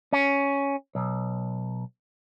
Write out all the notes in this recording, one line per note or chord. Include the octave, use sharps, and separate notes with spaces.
C#4
B1